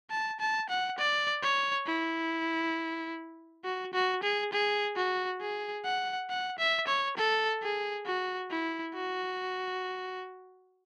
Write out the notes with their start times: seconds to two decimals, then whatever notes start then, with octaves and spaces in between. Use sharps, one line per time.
0.11 A5
0.40 A5
0.69 F#5
0.99 D5
1.43 C#5
1.87 E4
3.65 F#4
3.94 F#4
4.23 G#4
4.53 G#4
4.97 F#4
5.41 G#4
5.85 F#5
6.30 F#5
6.59 E5
6.88 C#5
7.18 A4
7.63 G#4
8.06 F#4
8.51 E4
8.94 F#4